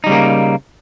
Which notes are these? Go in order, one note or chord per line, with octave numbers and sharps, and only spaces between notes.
C#3 G3 A#3 D#4